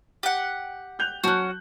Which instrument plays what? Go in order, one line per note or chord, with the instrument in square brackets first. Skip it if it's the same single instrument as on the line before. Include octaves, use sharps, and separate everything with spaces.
[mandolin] G4 F#5
[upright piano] F#6 G6 F7
[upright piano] F#3 A5 F#6 [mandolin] C#4 F#4